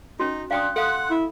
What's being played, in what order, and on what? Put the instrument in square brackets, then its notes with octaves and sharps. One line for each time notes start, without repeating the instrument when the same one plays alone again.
[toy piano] C#4 F#4 [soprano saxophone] D#4
[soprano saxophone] D4 [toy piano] F5 G5 D#6 [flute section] C6 F#6
[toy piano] A4 F5 D#6 [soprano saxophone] F#5
[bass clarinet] E4